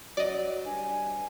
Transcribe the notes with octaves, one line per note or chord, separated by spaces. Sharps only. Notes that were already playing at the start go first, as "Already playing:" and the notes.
F#3 D5 D#5
G2 G#5